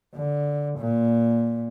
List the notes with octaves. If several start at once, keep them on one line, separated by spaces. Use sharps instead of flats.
D3
A#2